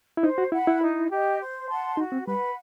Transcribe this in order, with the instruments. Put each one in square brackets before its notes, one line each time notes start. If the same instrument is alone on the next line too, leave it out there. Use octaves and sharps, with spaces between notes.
[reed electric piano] E4
[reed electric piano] D#4 [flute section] C5
[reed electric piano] F#4
[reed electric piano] E4 [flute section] F#5 B5
[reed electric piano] E4
[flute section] D#4
G4 D#5
C5
F#5 A5 C6
[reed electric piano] D#4 [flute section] F#4
[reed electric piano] C4
[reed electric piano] G3 [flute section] B4 F#5 B5